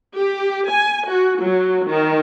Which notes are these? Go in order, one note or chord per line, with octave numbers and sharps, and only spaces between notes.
G4
G#5
F#4
F#3
D#3